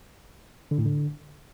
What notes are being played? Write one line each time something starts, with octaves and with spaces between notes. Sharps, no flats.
D3
A2
D3